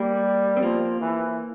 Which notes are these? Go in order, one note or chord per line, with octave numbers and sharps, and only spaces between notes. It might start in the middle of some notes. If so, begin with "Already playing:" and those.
Already playing: G3 A#3
C4
F3 A#3
E3